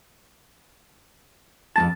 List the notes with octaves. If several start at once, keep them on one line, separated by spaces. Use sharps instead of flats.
F2 G#3 A5 A6